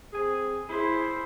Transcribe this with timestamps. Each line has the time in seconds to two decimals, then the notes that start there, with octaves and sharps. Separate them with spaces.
0.13 C4 G#4
0.69 E4 G#4 C5